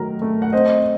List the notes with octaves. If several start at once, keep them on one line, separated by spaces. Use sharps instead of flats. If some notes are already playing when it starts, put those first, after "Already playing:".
Already playing: D#3 F#3 A3 D#4 A#4
A3
F#5
C4 C5 D#5